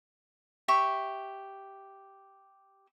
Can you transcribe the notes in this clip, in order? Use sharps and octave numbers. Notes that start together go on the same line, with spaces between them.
G4 E5 C#6